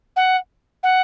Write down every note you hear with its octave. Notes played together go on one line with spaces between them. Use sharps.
F#5
F#5